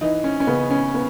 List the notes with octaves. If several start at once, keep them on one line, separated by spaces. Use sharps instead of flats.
E3 D#4
C#4
C#4
C#3 B3
C#4
B3